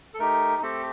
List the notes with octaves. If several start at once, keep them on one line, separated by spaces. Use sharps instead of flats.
A4
A3 D#4 G4 A#4
A3 C4 G4 A4